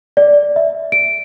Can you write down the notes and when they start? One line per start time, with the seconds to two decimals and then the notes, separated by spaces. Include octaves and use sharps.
0.17 D5
0.56 E5
0.92 D7